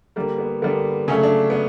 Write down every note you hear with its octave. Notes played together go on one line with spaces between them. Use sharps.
D3 G3 A#3
B3
D3 G3 A#3 B3
C#3 F#3 A3 C#4
D4
B3